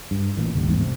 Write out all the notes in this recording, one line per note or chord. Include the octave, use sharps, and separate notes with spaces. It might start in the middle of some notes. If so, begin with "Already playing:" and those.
G2
A1 A#2 E3
G1 D#2 D3 G3
A1 E2 G#2 G3
C3